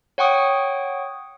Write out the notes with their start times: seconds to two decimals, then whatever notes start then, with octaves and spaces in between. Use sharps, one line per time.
0.18 C#5 F#5 G5 C#6 D#6